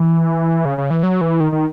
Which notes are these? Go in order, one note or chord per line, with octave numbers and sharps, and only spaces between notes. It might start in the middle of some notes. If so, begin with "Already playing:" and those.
Already playing: E3
C#3
C#3
E3
F#3
E3
D#3
D#3